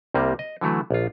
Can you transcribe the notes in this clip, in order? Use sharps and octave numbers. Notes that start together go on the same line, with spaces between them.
C2 C3 G3 A#3
D#5
D3 E3 F#3 A3
A#1 F4